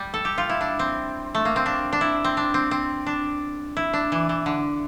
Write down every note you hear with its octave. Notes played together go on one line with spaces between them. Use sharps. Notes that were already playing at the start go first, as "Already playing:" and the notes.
Already playing: G3
A4
G4
F4
E4
D4
C4
A3
A#3
C4
D4
D4
E4
C4
D4
C4
C4
D4
E4
D4
E3
E3
D3